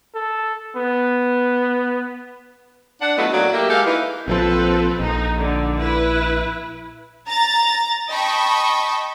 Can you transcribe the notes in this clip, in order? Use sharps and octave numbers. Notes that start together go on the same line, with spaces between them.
A4
B3
D4 F#5
F#3 A3 B3 E4 F4 D#5
A2 F#3 A#3 D4 F#4 D5
A3 A#3 G4 E5
G#3 G4 A4 A#4 F5
E3 D#4
A#1 E3 F3 C4 A4 B4
A#1 D#4
D3
E4 B4
A#5 A6
D#5 G5 A5 B5 C#6